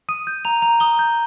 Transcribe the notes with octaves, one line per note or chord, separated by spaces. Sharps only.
D#6 D#7
G6
A#5 F7
A#5 F7
D#6 G7
G6